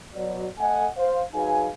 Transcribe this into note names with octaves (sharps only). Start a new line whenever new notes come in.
B2 F#3 D5
A3 A4 D#5 F#5 G#5
C5 F5
F#3 D#4 G#4 B4 F5 G#5